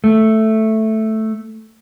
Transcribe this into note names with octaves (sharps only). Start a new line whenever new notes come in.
A3